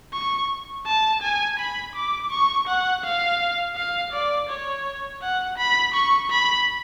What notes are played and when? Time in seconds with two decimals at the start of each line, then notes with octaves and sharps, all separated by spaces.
0.13 C#6
0.86 A5
1.22 G#5
1.59 B5
1.95 D6
2.31 C#6
2.68 F#5
3.04 F5
3.76 F5
4.13 D5
4.49 C#5
5.22 F#5
5.58 B5
5.94 C#6
6.31 B5